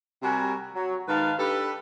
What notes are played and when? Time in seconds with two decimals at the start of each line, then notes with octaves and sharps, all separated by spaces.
0.23 C3 G3 F#4 A#4 G#5 B5
0.74 F#3
1.08 G#2 D#3 B4 F5 A5
1.38 D4 G4 A4 B4